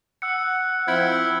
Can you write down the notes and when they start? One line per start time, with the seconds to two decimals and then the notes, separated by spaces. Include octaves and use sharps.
0.22 F#5 E6 F#6 C#7
0.88 F3 C4 E4 F6 G6 G#6